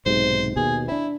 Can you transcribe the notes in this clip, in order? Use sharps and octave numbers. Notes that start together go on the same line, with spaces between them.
B1 G#2 C3 C5
D#2 B2 G#4
C4 D4 E4